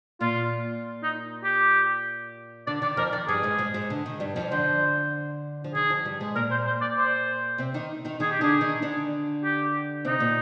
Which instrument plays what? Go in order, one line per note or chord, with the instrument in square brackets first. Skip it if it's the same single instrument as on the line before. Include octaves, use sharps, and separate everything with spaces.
[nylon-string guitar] A#2 A#3 [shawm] F4
[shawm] D#4
G4
[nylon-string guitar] D3 [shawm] D5
[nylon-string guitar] D#3 [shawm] D5
[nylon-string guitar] F2 F3 [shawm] A#4
[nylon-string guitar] D#3 [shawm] D5
[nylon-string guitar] G2 G3 [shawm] G#4
[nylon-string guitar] G#2 G#3
G#2 G#3
G#2 G#3
D3
D#3
G2 G3
F2 F3
[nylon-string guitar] D3 [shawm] C5
[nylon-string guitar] F3
[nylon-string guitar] D#3 [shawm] G#4
[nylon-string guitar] F2 F3
G2 G3
G#2 G#3
[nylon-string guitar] A#2 A#3 [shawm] A#4
[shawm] C5
C5
D5
C5
[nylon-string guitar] C3 C4
D#3 D#4
D#3 D#4
[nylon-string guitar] D#3 D#4 [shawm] G#4
[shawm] G4
[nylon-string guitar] D3 D4 [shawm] G#4
[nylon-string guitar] D#3 D#4
D3 D4
[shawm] G4
[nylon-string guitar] C3 C4 [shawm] D#4
[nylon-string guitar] A#2 A#3